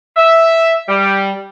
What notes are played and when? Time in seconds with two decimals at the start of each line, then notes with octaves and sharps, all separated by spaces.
0.17 E5
0.89 G3